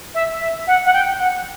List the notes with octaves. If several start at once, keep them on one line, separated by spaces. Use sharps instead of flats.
E5
E5
F#5
F#5
G5
F#5